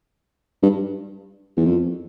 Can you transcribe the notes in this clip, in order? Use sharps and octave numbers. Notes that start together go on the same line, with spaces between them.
G2
E2
F2